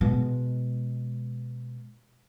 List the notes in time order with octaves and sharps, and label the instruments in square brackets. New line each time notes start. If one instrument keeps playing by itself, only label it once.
[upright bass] B2 G#3